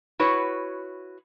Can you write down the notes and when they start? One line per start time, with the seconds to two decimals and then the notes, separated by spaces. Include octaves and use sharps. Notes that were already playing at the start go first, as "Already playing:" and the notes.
0.19 E4 F#4 B4 C#5